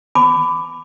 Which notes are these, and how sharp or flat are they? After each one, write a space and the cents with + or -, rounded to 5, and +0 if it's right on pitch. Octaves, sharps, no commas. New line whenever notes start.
B5 +25 D6 +0